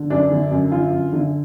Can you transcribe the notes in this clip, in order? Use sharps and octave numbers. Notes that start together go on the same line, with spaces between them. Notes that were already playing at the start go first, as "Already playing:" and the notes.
Already playing: D3
F#2 D4
D3
F#2
D3 F4
F#2
D3